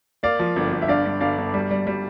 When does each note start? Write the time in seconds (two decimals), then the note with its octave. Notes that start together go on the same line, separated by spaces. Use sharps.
0.23 A#3 D5 F5
0.39 F3
0.56 G1
0.72 G1
0.82 E5
0.88 G2 D5 F5
1.05 G2
1.21 G1 D5 F5
1.38 G1
1.54 G3
1.71 G3
1.87 G3